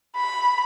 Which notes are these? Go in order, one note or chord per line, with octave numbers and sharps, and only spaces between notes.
B5